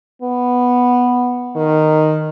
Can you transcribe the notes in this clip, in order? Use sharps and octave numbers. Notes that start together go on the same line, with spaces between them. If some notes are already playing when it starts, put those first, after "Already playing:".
B3
D#3